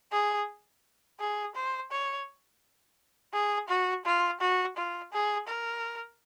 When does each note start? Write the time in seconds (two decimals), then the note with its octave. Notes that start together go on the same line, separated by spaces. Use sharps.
0.12 G#4
1.20 G#4
1.55 C5
1.91 C#5
3.33 G#4
3.69 F#4
4.05 F4
4.40 F#4
4.77 F4
5.12 G#4
5.47 A#4